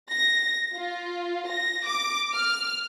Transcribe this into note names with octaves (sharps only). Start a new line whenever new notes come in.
A#6
F4
A#6
D6
F6